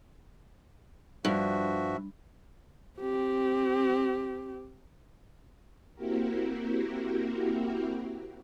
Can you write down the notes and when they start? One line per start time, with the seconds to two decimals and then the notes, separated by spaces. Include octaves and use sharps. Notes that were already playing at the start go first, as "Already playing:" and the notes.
1.25 G2 F3 F#4 E5
3.00 C4 G4
5.94 A#3 C4 E4 F#4 G4 A#4